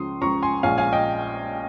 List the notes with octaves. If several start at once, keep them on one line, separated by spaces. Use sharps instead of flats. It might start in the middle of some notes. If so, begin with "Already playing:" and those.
Already playing: C#2 C#3 F3 C6 D#6
C#2 C#3 F3 A#5 C#6
G#5 C6
A#1 A#2 G#3 C#4 F5 G#5
F5 G#5
D#5 G5